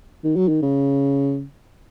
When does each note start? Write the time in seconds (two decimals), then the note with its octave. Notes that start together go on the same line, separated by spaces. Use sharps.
0.24 D#3
0.36 F#3
0.49 D#3
0.62 C#3